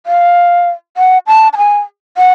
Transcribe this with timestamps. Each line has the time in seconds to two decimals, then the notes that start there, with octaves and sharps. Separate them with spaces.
0.06 F5
0.97 F#5
1.27 A5
1.53 A5
1.57 G#5
2.18 F#5